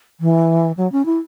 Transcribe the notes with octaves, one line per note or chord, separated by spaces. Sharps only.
E3
F#3
C#4
E4